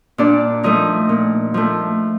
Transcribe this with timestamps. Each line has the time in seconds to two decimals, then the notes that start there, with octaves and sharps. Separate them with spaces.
0.18 A#2 D4 D5
0.63 F3 A3 D#4 D#5
1.09 A#2
1.54 F3 A3